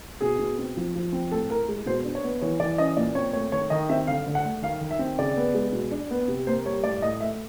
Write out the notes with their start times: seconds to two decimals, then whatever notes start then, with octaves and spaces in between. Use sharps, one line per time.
0.21 B2 G#4
0.39 B2
0.59 C4
0.77 F3
0.95 F3
1.13 C4
1.31 A2 A4
1.50 A2 A#4
1.68 G#3
1.86 B2 C5
2.05 D4
2.15 C#5
2.24 B3
2.41 E3 C#5
2.60 E3 D5
2.78 C#4 D#5
2.97 A#2 D5
3.15 C4 C#5
3.33 A3 C#5
3.52 D#3 C#5
3.70 D#3 D#5
3.89 C4 E5
4.07 D3 F5
4.27 D3
4.35 F#5
4.44 A3
4.62 D#3 F5
4.81 D#3
4.91 E5
4.99 C4
5.19 C#3 D5
5.37 B3
5.54 G#3
5.73 B2
5.91 D4
6.11 B3
6.28 C3
6.47 A#3 C5
6.66 G3 C#5
6.83 A2 D5
7.01 A2 D#5
7.20 A3 E5